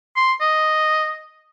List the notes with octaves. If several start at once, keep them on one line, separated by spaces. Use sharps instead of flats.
C6
D#5